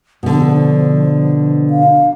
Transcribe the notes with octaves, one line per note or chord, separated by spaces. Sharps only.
B2 D3 F3
F5